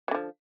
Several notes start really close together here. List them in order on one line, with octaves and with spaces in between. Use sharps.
F#3 D3 F3